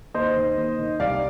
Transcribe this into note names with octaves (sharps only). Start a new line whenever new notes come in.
D#2 C5 D#5
D#3
D#2
D#3
C2 D5 F5